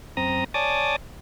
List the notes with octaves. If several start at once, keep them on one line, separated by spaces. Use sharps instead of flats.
F#2 C4 A#5 D#6
C#5 D5 G#5 A5 D6 D#6